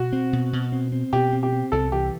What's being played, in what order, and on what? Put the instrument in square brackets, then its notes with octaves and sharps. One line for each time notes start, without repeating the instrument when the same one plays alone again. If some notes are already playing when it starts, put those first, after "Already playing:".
Already playing: [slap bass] B2 [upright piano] F#4
[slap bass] C4
B2
B2
C4
C4
[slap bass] B2 [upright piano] G4
[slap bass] C4
[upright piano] G4
[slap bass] C4
[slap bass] C2 [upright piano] A4
[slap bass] E3 [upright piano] G4